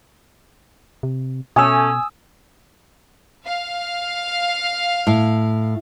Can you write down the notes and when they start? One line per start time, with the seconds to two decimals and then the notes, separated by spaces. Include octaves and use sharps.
1.03 C3
1.56 B2 A3 C#4 G#5 D#6 E6
3.44 F5
5.07 A2